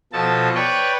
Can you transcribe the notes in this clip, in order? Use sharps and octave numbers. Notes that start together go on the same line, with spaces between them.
B2 F3 A4 A5
B4 C#5 D5 G5